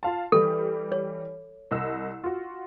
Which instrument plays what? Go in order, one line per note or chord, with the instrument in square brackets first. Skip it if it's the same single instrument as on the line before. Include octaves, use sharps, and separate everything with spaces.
[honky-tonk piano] F4 F5 A5
[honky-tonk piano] E3 G3 [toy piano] A4
[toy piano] C#5
[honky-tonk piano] C2 D#5 E6
F4 F#4